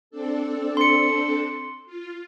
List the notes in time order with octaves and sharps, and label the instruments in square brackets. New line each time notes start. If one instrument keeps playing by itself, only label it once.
[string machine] C4 D4 A4
[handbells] C6 C#7
[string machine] F4